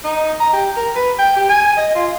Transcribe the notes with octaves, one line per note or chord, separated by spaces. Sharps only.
D#4
A#5
G4
A#4
B4
G5
G4
G#5
D#5
F4